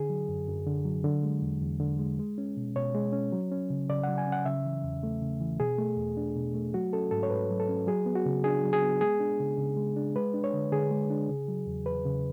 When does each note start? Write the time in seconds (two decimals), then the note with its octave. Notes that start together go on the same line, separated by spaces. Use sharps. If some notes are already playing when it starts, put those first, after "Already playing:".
Already playing: D3 G#4
0.10 F#3
0.29 F#2
0.48 F#2
0.67 D3
0.85 F#3
1.04 D3
1.23 G#3
1.42 E2
1.62 E2
1.80 D3
1.99 G#3
2.19 G#3
2.38 C#4
2.57 B2
2.76 B2 C#5
2.95 G#3
3.13 C#4
3.32 F#3
3.52 C#4
3.70 C#3
3.90 C#3 D5
4.04 F#5
4.09 F#3
4.18 G#5
4.27 C#4
4.32 F#5
4.45 C#3 E5
4.65 E3
4.84 E2
5.03 A3
5.21 C#3
5.40 E3
5.60 B2 G#4
5.79 A3
5.97 E2
6.17 D4
6.36 B2
6.54 A3
6.74 F#3 F#4
6.93 C#4 A4
7.11 G#2 A4
7.23 C#5
7.30 G#2 B4
7.50 F#3
7.60 A4
7.69 C#4
7.87 F#3 G#4
8.06 B3
8.15 F#4
8.26 C#3
8.44 D4 G#4
8.64 F#3
8.73 G#4
8.83 B3
9.01 G#3 G#4
9.20 D4
9.39 C#3
9.58 C#3
9.77 G#3
9.96 D4
10.16 G#3 B4
10.34 D4
10.44 C#5
10.53 D3
10.72 D3 G#4
10.91 G#3
11.10 D4
11.29 C#3
11.48 F#3
11.67 E2
11.86 E2 B4
12.05 C#3